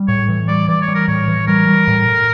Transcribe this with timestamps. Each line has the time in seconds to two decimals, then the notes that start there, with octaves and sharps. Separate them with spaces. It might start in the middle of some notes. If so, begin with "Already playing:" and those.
Already playing: G3
0.08 A2 C#5
0.29 E3
0.48 G3 D5
0.68 E3 D5
0.82 C#5
0.88 G3
0.95 A#4
1.08 A2 C#5
1.28 E3
1.47 G3 A#4
1.67 G3
1.88 A2
2.08 A2